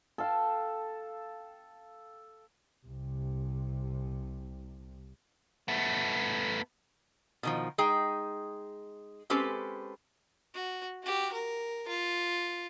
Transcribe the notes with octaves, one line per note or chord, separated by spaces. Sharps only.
A4 F5 G5
C2 C3
A3 B3
B2 D#3 F3
G#3 D#4 G#4 G5
G#3 C4 C#4 G4 A4 B4
F#4
F#4 G4
A#4
F4